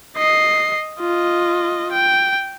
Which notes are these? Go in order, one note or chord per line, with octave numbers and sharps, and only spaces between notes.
D#5 C7
F4 D#5
G5